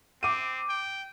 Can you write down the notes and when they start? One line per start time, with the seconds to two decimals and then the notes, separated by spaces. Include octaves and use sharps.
0.23 C4 D6 D#7
0.69 G5